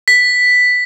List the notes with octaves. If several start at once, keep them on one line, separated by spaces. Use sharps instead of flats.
B6